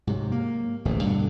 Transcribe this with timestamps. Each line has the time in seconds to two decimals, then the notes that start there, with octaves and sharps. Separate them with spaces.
0.07 G#2 C3 F#3
0.32 A#3
0.85 D1 A1 F#2 B2
1.03 G2 B2 D3